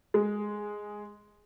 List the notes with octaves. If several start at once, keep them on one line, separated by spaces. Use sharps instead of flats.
G#3